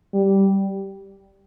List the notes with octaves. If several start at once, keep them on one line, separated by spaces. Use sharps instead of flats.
G3